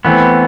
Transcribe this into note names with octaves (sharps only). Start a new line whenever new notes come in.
E3 A3 B3 C4